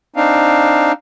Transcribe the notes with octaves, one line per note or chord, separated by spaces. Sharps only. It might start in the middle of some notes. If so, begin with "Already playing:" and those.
C4 D4 D#4 F5